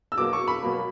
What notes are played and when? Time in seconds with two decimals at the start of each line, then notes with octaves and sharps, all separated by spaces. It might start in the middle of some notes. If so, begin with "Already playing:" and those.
0.12 E6
0.18 B2 F#3 A#3 D6
0.33 C#6
0.48 B5
0.63 B2 F#3 A#3